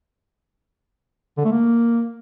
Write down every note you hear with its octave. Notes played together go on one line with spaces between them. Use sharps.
D3
A3
A#3